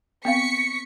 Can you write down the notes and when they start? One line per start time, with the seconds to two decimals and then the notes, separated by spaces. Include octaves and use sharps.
0.25 B3 C4 F5 C#6 B6 C#7